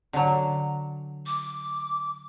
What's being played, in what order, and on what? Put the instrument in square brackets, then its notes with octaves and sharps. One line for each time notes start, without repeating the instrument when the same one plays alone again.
[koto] D3 F#3
[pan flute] D6